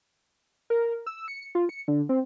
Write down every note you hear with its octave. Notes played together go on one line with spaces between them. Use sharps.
A#4
E6
C#7
F4
C#7
D3
C4